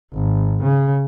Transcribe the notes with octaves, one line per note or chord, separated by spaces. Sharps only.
G#1
C#3